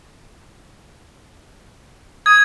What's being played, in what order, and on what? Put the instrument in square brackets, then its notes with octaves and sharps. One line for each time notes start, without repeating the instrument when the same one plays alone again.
[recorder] D#6 [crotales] G#6